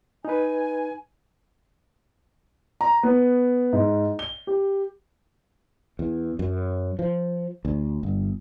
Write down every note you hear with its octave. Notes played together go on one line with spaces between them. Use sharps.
D#4 B4 G#5
A#5
B3
G#2
G7
G4
E2
F#2
F3
D2
G1